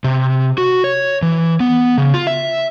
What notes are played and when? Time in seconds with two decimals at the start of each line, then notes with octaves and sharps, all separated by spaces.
0.04 C3
0.58 F#4
0.84 C#5
1.22 E3
1.60 B3
1.98 C#3
2.14 F4
2.27 E5